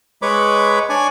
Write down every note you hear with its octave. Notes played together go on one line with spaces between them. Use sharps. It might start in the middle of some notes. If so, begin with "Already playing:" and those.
G#3 B4 C#5 B5 D6
D4 C#5 D5 G#5